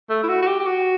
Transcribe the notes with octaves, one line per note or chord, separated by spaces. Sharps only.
A3
E4
F#4
F#4
G4
G4
F#4